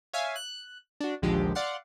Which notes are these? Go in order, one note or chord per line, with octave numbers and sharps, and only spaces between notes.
C#5 E5 F5 G#5
F#6
D4 F#4
A#1 D#2 D3 F3 G#3 G4
D5 F5 F#5 C6